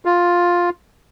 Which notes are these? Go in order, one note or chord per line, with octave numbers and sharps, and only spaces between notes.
F4